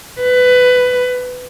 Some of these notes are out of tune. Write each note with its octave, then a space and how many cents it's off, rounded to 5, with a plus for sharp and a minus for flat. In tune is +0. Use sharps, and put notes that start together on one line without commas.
B4 +15